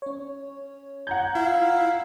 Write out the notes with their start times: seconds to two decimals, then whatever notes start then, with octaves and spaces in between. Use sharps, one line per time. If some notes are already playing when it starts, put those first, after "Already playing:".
0.02 C#4 C#5
1.07 F#5 A#5 G6 G#6
1.35 E4 F4 F5